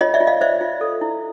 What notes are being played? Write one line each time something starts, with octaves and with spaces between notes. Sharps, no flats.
F4 C#5 D#5
D5 E5
F4
D#5 F5
C5 D5 E5
F4
A4
E4